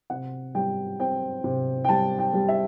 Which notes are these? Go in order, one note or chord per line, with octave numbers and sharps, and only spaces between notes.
C3 F#5
G3 G5
C4 G5
C3
G5
G3 A5
G5
G3
E5